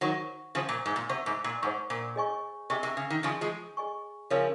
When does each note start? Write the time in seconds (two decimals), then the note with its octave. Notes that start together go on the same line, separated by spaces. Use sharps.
0.01 D#3 F#3 C5 F#5 C#6
0.55 C#3 F3 C5 F#5 C#6
0.69 A#2
0.86 G#2
0.96 A#2
1.09 C3 C5 F#5 C#6
1.26 G#2
1.44 A#2
1.62 G#2 C5 F#5 C#6
1.90 A#2
2.16 G#4 D#5 G#5 C#6
2.70 C3 G#4 D#5 G#5 C#6
2.83 C3
2.97 C#3
3.10 D#3
3.23 C#3 F3 G#4 D#5 G#5 C#6
3.41 F3 G#3
3.77 G#4 D#5 G#5 C#6
4.30 C#3 F3 A#4 C#5 F5